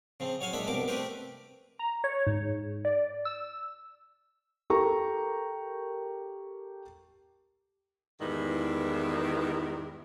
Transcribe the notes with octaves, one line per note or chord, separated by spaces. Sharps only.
C#3 F3 C4
F#3 C#5 F5 G#5
A#2 G#3 D4 E5 B5
C2 G2 B2 F3 A#4 D6
A3 C4 G4 A#4 B4
A#5
C#5
G#2
D5
E6
G4 A4 A#4 G5 A#5 C#6
E2 G#2 D#3 G3 E4 B4